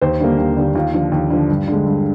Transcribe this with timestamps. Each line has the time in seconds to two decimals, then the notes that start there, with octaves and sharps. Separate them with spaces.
0.02 D#2 C5
0.20 D3 G3 A#3
0.38 D#2
0.56 D3 G3 A#3
0.75 D#2 F4
0.94 D3 F3
1.12 D#2
1.30 D3 F3
1.49 G2
1.67 D3 G#3
1.87 G2